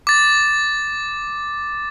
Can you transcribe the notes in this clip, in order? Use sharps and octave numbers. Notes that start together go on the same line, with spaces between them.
D6 A6